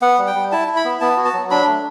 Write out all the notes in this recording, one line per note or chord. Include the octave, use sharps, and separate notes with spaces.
B3 F#5
G3
G5
G3
E4 A5
E4
B5
B3
B3 A5
F#4
A5
F#3
D4 B5
A3